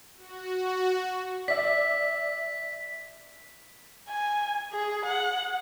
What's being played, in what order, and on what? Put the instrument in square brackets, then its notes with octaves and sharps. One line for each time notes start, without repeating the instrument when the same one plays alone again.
[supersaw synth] F#4
[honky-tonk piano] D5 E5 [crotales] B6
[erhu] G#5
G#4
F#5